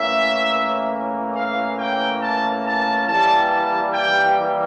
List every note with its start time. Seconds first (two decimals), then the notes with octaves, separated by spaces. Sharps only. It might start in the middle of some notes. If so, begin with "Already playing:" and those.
Already playing: A2 E3 A#3 C#4 E5
1.34 F5
1.78 G5
2.21 A5
2.65 A5
3.07 E3 G3 A#3 A5
3.51 A5
3.94 G5